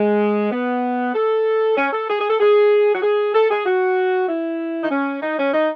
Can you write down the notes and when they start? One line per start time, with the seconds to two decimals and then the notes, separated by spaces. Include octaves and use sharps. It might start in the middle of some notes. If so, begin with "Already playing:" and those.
Already playing: G#3
0.52 B3
1.15 A4
1.77 C#4
1.93 A4
2.09 G#4
2.20 G#4
2.30 A4
2.40 G#4
2.95 F#4
3.02 G#4
3.35 A4
3.50 G#4
3.66 F#4
4.29 E4
4.83 D#4
4.91 C#4
5.22 D#4
5.38 C#4
5.53 D#4